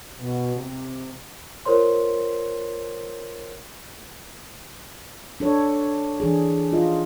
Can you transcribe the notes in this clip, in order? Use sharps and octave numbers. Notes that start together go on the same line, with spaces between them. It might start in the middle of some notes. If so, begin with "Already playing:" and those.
B2
C3
F4 A#4 C5 C#5 C6
D4 A4 C#5
E3 D4 G#4
F4 D#5